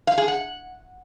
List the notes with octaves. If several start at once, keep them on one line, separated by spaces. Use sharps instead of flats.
F5
G#4
F#5